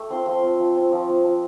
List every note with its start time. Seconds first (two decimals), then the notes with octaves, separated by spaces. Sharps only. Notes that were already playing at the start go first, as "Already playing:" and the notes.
Already playing: A3 G5 D6
0.10 C4 F4 C6
0.26 F3 C6
0.43 C4 F4
0.59 F3
0.75 C4 F4
0.92 F3 D6
1.08 C4 F4
1.24 F3